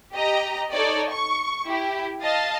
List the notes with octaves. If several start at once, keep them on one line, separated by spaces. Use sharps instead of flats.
G4 D#5 A#5
D#4 A4 C#5 D5
C#6
E4 G4
D#5 F5 A5 A6